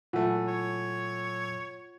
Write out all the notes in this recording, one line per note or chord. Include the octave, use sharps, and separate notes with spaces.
A#2 E3 F#3 A3 F4 F#5
C#5